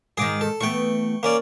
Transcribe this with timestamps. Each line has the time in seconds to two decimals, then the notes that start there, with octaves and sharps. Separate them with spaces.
0.17 G#2 D#3 G#4 D6
0.41 A4
0.61 E3 A3 B3 G5 C#6
1.23 A#3 C#4 D5